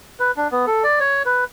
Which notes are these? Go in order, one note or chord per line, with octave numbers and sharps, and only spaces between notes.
B4
D4
B3
A4
D5
C#5
B4